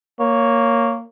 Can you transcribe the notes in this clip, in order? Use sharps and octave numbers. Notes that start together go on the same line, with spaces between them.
A#3 C#5